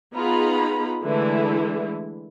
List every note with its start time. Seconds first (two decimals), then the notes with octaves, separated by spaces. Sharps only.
0.14 B3 D#4 F4 G#4 A#5 B5
1.03 D3 E3 G#3 A3 E4